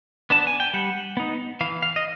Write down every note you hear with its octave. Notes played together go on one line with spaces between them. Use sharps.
B3 D4 A5
G#5
G5
G3 F#5
B3 D#4
E3 F5
F5
D#5